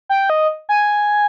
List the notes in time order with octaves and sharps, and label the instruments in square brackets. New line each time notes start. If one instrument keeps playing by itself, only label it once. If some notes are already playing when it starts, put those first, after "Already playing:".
[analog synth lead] G5
D#5
G#5